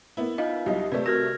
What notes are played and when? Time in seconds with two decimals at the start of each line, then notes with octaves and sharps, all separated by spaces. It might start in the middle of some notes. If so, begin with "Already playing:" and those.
0.17 A#3 B3 E4
0.38 D#4 F4 D#5 F5
0.66 C2 F#3 D#4 G4
0.92 C3 A3 B4 D5
1.06 F#4 A#4 F6 G#6 A#6